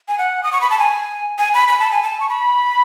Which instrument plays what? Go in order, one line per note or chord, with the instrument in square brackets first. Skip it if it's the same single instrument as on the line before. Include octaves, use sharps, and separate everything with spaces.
[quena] G#5
F#5
D#6
C#6
B5
A5
G#5
G#5
B5
B5
A5
G#5
A5
C#6
B5